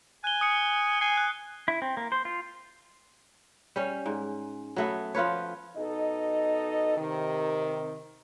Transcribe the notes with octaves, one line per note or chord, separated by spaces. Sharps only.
G#5 F#6 G7
D#6 C#7
G#5 C7
F#6
E4
C4
A#3
C5
F4
G3 C#4
G#2
F#3 A3 B3
F3 F4 B4 C#5
B2 D#4 A4 D#5
C3 D#3